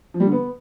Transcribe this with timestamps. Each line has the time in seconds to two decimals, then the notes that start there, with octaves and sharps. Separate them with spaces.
0.14 F3
0.20 G3
0.26 D3
0.32 B3